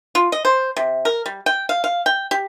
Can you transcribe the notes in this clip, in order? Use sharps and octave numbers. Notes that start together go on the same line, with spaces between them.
F4
D#5
C5
C3
A#4
G3
G5
F5
F5
G5
G4